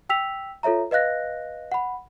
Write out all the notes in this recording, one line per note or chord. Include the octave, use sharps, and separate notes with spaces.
G5 E6 B6 F7
F4 A4 C#5 E5 A#5
B4 D#5 F5 F#6 A#6
F#5 B5